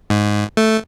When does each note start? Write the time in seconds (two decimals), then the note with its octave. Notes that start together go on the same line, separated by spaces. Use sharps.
0.10 G#2
0.57 A3